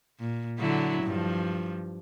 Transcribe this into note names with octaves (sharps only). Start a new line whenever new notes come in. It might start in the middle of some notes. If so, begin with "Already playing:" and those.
A#2
D3 F#3 E4
G2 F3